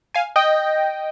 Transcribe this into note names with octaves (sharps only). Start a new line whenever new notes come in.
F5 G#5
D#5 G5